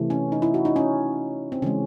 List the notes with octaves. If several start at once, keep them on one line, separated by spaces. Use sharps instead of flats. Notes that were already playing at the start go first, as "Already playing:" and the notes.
Already playing: C3 E3 A3
C#4
D#4
E4
F#4
D#4
C#4
C4
C#3 E3 G#3 C#4